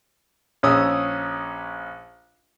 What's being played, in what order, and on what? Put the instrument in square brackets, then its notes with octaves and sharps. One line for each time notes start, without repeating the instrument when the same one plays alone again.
[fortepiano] A#1 C#4 D#6 E6